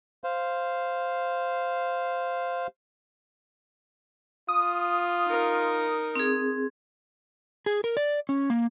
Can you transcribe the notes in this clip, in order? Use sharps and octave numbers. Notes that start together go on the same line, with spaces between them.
C5 F5
F4 D#6
D#4 A#4
C4 G#4
G#4
A#4
D5
C#4
A#3